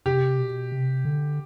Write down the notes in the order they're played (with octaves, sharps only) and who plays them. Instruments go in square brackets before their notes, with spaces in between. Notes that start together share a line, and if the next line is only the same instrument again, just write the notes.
[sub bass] C3 [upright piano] G4
[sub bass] B2
C3
D3